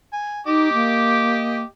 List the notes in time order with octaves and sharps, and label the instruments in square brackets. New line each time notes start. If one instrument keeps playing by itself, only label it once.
[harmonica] G#5
[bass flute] D#4 [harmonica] G4 D#5 D6
[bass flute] A#3